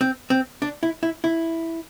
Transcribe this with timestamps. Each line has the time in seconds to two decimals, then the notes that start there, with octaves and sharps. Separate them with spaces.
0.01 C4
0.30 C4
0.62 D4
0.83 E4
1.03 E4
1.24 E4